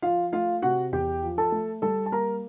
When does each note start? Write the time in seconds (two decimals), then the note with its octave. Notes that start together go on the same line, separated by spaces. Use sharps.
0.02 F3 F4 F5
0.32 A3 F4 F5
0.62 C3 F#4 F#5
0.92 E2 G4 G5
1.23 F3
1.38 A4 A5
1.52 A3
1.82 G3 A4 A5
2.06 A5
2.12 A#3 A#4 A#5